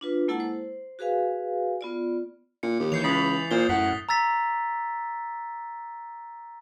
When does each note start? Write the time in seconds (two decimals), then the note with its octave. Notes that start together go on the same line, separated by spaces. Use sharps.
0.01 D4 F4 B4
0.28 G#3 A#3 E4 A4 F#5 A5
0.40 C5
0.99 F#4 G#4 B4 F5 G#5
1.81 B3 F4 D5
2.63 A#2 C#7
2.80 D#2 G4
2.92 E3 C#5 G6 C7 F7
3.04 C#2 B5 D#6 A6
3.51 A#2 C5 G7
3.69 F#2 A2 F#5 B6
4.09 A#5 E6 A6 B6